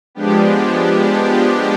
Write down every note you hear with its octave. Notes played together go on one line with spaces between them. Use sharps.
F3 G#3 B3 D4 G4